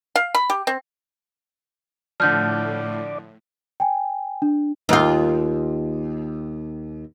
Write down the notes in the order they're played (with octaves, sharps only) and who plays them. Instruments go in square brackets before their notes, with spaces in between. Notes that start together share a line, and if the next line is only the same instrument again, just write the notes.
[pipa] F5
B5
G4
C4
[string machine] A2 [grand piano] D3 F3 [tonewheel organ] D5 [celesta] F6 G6
[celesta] G5 G#5
D4
[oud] D#2 F4